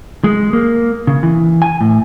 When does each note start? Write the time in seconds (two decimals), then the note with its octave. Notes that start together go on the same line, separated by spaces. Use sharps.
0.24 G#3
0.53 A#3
1.07 C#3
1.23 E3
1.62 G#5
1.81 A2